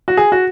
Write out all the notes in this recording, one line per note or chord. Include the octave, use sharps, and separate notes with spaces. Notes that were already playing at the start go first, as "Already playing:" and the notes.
F#4
G#4
F#4